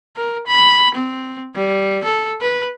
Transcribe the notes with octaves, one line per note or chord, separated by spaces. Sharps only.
A#4
B5
C4
G3
A4
B4